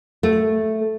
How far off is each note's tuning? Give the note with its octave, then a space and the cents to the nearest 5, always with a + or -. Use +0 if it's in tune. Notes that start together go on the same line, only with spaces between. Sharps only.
A3 -5